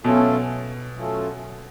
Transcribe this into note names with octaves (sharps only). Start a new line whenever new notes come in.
B2 F#3 A3 C#4 F4 A4
F#3 A3 C#4 F4 A4